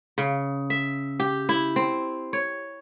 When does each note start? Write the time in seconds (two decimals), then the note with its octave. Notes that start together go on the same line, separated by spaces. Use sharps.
0.18 C#3
0.70 E5
1.20 G4
1.49 E4
1.76 C4
2.33 C#5